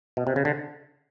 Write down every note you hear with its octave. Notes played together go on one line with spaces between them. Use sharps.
B2
C3
C#3
D3